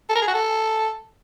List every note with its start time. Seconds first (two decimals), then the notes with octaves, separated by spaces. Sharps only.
0.09 A4
0.15 A#4
0.22 G#4
0.28 F#4
0.34 A4